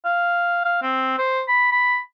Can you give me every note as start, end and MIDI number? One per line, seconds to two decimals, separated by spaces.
0.05 0.61 77
0.65 0.78 77
0.82 1.17 60
1.18 1.42 72
1.48 1.70 83
1.72 1.99 83